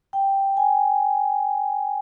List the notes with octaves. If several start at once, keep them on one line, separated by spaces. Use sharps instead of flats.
G5
G#5